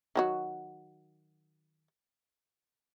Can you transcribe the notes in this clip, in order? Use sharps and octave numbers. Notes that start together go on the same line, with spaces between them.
D#3 F#3 F#4